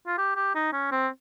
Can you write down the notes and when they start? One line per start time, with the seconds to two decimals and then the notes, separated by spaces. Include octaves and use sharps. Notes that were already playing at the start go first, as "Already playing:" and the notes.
0.07 F4
0.18 G4
0.36 G4
0.55 D#4
0.73 C#4
0.91 C4